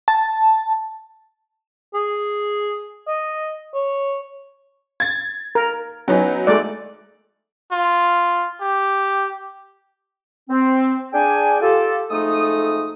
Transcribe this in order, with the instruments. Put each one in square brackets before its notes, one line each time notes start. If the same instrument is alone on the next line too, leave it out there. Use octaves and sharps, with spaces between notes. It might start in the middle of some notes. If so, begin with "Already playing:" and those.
[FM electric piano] A5
[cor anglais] G#4
D#5
C#5
[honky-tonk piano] G#6 A6
[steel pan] A#4
[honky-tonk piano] F#3 B3 D#4 [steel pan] C#4
[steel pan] G#3 A3 D5
[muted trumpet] F4
G4
[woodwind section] C4
D4 G#4 G5 G#5
F4 G4 A4
F2 G#3 A3 D#4 A4 D#6